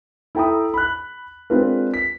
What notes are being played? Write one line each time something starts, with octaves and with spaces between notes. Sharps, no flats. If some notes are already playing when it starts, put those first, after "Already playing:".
E4 A4 G5 A#5 B5 D#6
B5 F#6
G#3 C4 D4 F4 A#4 B4
B6